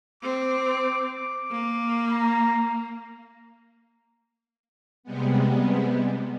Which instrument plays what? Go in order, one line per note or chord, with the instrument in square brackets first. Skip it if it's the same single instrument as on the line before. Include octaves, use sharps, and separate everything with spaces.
[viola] C4 [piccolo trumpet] D6
[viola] A#3
[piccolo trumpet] A#5
[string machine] C3 G3 G#3 B3